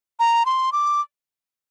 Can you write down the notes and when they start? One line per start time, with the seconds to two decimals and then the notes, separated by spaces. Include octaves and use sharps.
0.19 A#5
0.46 C6
0.72 D6